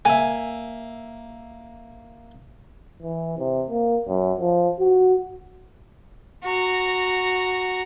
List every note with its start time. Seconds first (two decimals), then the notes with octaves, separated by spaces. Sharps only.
0.05 A#3 E5 G#5
3.02 E3
3.38 C3
3.70 A#3
4.08 F#2
4.40 F3
4.80 F#4
6.44 F#4 A#5